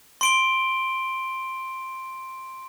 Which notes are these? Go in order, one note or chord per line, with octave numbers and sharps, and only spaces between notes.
C6 D7 G7